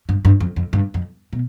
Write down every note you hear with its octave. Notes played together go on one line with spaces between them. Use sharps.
G2
G2
F2
F2
G2
F2
B2